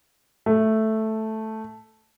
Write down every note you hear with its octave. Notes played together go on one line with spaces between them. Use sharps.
A3